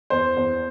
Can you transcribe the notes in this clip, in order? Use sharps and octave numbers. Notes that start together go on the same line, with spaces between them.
E2 C5
E2